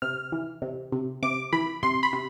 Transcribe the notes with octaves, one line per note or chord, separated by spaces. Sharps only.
C3 F6
E3
C3
C3
C3 D6
E3 B5
C3 C6
B5
C3